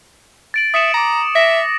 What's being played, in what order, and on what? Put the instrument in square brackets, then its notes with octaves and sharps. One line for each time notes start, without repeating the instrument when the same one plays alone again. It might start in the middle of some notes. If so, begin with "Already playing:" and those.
[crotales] A6 D7 F#7
[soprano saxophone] E5 [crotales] D#6 C#7 E7
[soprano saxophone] A#5 [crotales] D6 D7
[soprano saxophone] E5 [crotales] A#6